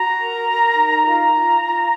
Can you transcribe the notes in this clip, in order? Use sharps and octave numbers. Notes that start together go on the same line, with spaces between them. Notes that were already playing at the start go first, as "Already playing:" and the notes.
Already playing: F#4 A#5
A#4
A#4
D#4
F4 A#5
F4
F4